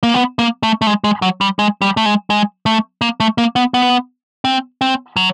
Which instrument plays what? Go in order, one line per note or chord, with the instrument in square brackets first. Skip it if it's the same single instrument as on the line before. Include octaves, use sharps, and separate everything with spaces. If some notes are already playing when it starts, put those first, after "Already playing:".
[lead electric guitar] A#3
B3
A#3
A3
A3
G#3
G#3
F#3
G3
G#3
G3
A3
G#3
G#3
A3
A#3
A3
A#3
B3
B3
C4
C4
F#3